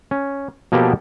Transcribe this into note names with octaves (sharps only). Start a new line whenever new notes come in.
C#4
B2 F3 A#3 B3 G4 A4